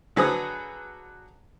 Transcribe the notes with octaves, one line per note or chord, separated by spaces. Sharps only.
D3 F#3 G#4 B4 D#6